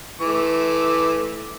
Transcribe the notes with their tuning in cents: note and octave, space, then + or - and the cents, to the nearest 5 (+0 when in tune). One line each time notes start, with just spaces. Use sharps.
E3 -10 A3 -20 D6 +0